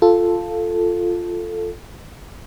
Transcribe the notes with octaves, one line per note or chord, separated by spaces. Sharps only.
F4 A4